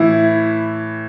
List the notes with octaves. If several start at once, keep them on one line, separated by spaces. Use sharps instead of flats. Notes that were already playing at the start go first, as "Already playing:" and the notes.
Already playing: A2 E3 E4